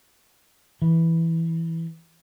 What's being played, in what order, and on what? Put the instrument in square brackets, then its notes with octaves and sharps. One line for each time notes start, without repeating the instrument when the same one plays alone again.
[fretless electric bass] E3